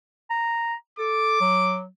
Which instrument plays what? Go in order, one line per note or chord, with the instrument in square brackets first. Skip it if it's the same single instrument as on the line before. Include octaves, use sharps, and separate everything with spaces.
[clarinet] A#5
[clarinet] A4 [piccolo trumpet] D6
[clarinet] F#3